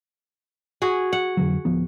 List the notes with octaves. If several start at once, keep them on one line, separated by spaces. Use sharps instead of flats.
F#4 G#4
F#5
F2 D3 F#3
D1 F3 B3